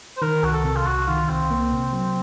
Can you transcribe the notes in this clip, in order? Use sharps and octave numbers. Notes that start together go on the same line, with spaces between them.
C5
D#3 A#4
C2 F#4
A4
C3
F4
C2 F#4
D#3 F4
C2 C4
A#3
C3
F#3